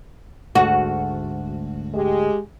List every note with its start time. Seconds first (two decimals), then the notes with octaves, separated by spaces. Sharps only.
0.55 D2 G#2 A3 F#4
1.95 G#3 G4